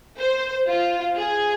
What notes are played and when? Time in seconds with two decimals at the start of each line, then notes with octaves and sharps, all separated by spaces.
0.19 C5
0.68 F4
1.18 G#4